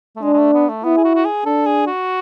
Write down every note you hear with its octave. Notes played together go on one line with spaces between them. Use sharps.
A3
G#3 D4
G#3
A3
B3
A3
B3 E4
G#4
F#4
F#4
G#4
D4 A4
G#4
F#4